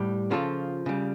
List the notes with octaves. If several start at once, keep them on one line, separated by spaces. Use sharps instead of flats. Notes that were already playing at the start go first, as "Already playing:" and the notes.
Already playing: A2 G3
C#3 F3 F4 A4
C#3 G3